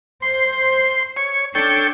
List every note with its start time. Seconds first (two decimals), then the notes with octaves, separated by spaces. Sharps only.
0.22 C5 C6
1.17 C#5
1.55 D4 A4 C#5 G5